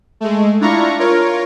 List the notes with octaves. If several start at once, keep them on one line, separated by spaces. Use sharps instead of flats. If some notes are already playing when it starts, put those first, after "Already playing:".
G#3 A3
D4 E4 F4 A#5 C#6
F4 A#4 C#5